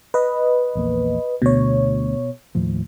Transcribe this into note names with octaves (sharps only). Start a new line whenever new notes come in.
B4 D#5
A#1 E2 A#3
D2 B2 C#5
D#2 A2 F3